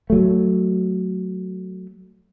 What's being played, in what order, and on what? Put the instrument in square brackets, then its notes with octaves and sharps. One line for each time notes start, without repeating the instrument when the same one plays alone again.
[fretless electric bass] F#3 A3